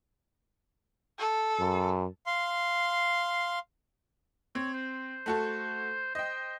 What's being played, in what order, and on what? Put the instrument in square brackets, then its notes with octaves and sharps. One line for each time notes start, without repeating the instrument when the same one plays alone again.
[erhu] A4
[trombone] F#2
[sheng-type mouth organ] F5 C6
[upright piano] C4 [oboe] C#5
[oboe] C5
[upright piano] A3 F#4 A4
[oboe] C5 [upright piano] D#5 G5